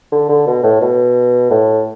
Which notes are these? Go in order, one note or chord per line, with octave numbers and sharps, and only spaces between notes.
D3
D3
B2
A2
B2
A2